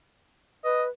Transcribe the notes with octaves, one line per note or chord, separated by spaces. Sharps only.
B4 D#5